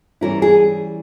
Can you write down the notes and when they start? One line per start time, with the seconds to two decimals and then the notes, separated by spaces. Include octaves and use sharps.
0.21 E3 G3 C#4 E4 A#4
0.42 G#4